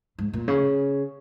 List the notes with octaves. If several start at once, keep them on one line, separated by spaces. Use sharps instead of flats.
G#2
A#2
C#3